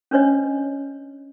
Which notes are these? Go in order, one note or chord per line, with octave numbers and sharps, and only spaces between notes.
C#4 D4 B4 C#5 D#5